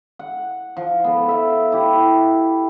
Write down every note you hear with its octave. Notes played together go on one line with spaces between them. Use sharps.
F#5
F3
B3 A4
E5 F5
E4 G4